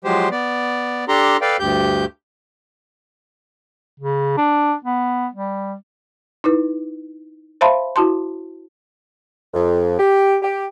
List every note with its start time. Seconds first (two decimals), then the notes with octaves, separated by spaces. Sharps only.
0.04 F3 F#3 G#3 G4 C5
0.31 B3 D5
1.08 D4 G4 A4 A#5 C6
1.41 A4 B4 D5 F5 G5
1.59 D2 G2 G4 G6
4.00 C#3
4.37 D4
4.85 B3
5.34 G3
6.44 D#4 E4 B4
7.61 C5 E5 F5 A5 B5 C6
7.96 E4 F#4 A5 C6
9.54 F2
9.99 G4
10.42 G4